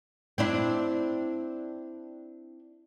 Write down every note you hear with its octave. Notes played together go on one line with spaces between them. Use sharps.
C4 D4 E4